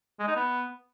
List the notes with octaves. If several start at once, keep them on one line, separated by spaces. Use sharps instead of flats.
G#3
D#4
B3